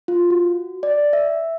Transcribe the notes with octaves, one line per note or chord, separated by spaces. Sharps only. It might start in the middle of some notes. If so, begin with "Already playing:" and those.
F4
F#4
D5
E5